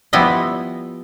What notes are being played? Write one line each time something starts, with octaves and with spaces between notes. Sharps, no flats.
F3 G3 B3 E4 B4 D#5